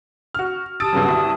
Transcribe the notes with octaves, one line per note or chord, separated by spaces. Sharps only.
F#4 F6
G4 A5 D#6 E6 A6 D7
G2 C#3 F#3
C2 F#4